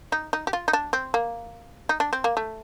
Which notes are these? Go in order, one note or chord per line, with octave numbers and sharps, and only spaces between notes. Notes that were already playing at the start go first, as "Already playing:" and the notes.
D#4
D#4
G4
F4
D#4
D4
C4
A#3
D#4
D4
C4
A#3
A3